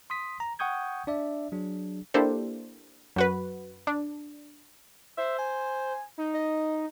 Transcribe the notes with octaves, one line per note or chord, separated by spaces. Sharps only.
C6 D#6 B6
A#5
F#5 G5 C#6 D#6 G6 G#6
D4 D5 E5
F#3 D4 G#4
A#3 D4 E4 G4 A4 C5
F#2 F#4 B4
D4
C5 E5
G#5
D#4
D#5